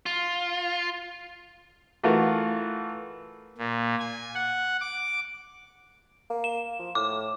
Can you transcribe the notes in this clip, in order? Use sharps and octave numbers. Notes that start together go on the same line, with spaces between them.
F4
E3 A3 F4 F#4 A#4
A#2
G#5
F#5
D6
A#3
E7
F3
A2 D6